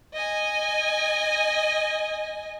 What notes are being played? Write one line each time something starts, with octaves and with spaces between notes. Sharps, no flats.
D#5 G#5